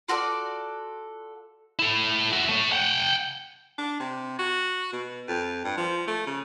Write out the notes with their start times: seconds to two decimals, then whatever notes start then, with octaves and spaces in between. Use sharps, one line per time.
0.08 F4 F#4 A4 D5
1.79 E4 A4
2.32 F#4 E5
2.49 A3 C#5
2.72 F#5 G5
3.78 D4
4.00 C3
4.39 F#4
4.93 B2
5.28 F2
5.64 G2
5.78 F3
6.08 A3
6.27 C#3